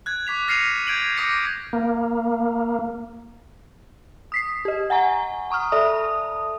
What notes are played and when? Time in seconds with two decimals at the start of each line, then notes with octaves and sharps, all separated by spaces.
0.06 F#6 G#6
0.27 C#6 D6 B6 F7
0.48 F6 A#6 C7 C#7 D#7 F7
0.87 G6 G#6 D7 F#7
1.16 D6 D#6 A#6 C#7
1.73 A#3
4.32 D#6 B6 C7
4.65 G4 D#5
4.90 F#5 G#5 A#5 C#6
5.50 A#5 C#6 D#6 F6
5.72 A4 D5 E5 A5 D#6